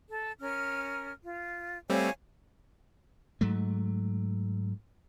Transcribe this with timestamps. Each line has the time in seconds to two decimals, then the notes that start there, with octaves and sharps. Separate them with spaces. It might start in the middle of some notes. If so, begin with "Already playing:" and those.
0.08 A4
0.40 C#4 A#4 F6
1.24 F4
1.90 G3 A3 C4 C#5 F5 G#5
3.41 G#2 F#3 A3